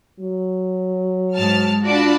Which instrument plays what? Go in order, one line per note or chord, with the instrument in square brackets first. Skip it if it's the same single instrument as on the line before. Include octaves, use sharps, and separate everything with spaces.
[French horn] F#3
[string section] G#2 A5 F6
[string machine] D4 F4 B5 [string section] F#4 D5 A5